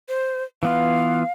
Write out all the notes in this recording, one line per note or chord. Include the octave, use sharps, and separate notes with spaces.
C5
E3 B3 F4 F5